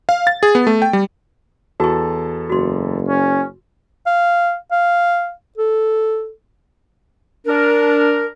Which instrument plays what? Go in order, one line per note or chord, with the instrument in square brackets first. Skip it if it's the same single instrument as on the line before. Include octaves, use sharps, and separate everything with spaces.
[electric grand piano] F5
A6
G#4
B3
A3
G5
G3
[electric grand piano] E2 A4 A5 [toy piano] F#4 C#6
[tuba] F#1 [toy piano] F#4 C6
[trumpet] C#4
[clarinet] F5
F5
A4
[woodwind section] D4 A#4